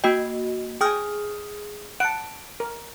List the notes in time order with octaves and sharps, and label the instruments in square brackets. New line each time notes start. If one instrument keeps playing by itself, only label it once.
[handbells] A#3 F#4 D#5 [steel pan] G5
[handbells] G#4 D#6 F6 [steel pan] G5 G#5
[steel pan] F#5 A5 [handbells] D7
[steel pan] A#4